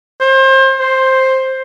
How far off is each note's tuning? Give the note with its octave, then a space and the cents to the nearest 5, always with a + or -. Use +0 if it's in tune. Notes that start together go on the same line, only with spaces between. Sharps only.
C5 +30
C5 +10